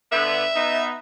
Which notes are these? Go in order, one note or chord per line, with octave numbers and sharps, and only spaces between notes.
D3 B3 E5
B3 D#4